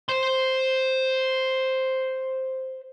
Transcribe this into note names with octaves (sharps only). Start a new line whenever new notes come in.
C5 C6